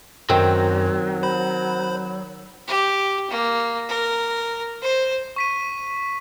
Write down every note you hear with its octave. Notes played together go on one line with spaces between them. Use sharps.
F#2 D#3 F#3 C4
C5 B5
G4
A#3
A#4
C5
C#6 B6 D#7